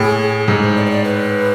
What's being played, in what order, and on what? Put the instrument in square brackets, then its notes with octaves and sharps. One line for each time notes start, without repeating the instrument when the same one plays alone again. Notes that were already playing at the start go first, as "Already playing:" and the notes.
Already playing: [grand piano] A2 [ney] G#4
[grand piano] G#2 [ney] A4
[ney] C5
D5
C5
D5
B4